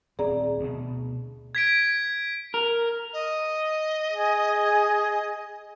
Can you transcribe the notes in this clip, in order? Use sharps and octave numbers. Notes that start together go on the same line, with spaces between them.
D#1 C4 G#4 D5 A#5
D2 B2
G#6 B6 D7
A#4
D#5
G#4